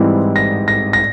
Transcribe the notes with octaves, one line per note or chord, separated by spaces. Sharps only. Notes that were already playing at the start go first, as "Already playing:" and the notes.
Already playing: G#2 E3 G3 C4 E4
A#6
A#6
A#6